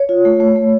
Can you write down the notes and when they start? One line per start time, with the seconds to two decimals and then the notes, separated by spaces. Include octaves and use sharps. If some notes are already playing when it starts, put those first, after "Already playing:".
Already playing: C#5
0.09 F4
0.25 A3
0.40 A3
0.56 A3